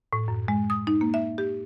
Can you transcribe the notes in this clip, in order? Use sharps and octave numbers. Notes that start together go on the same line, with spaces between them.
A2
F#2
G#3
D#6
D#4
A#3
E5
G4